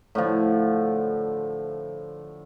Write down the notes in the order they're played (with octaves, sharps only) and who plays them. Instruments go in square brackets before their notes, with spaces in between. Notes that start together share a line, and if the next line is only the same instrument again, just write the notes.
[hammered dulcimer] A2 D3 F3